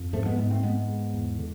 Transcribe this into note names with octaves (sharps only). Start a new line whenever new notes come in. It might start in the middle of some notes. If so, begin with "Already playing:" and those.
Already playing: F2
G#2 F3 A3
G#3 B3
G#2 G#3 B3
A3 C4
G#2 G#3 B3
G#2
E2
D3